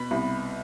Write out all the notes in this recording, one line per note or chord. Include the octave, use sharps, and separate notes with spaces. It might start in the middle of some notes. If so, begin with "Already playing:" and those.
Already playing: B2 B5
C2